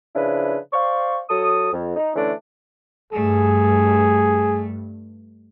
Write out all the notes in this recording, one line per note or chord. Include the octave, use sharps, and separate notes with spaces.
C#3 F3 D4 E4 B4
C5 D5 F5 C#6
F#3 A4 D#6
F2
D#4
D3 E3 A3 C#4 D4
G2 A3 G#4